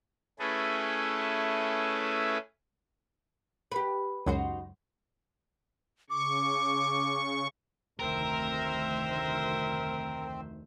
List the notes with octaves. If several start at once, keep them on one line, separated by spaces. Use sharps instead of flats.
A3 C#4 E4 G#4 A4 B4
G4 B4
C#2 F#2 D#4 F#4 C5
C#3 C#6 D6
F1 D2 D#3 C4 A#4 C5 E5